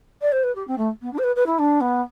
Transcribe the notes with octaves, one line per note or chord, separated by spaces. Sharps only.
D5
C5
B4
G4
C4
A3
B3
D4
C5
B4
B4
E4
D4
B3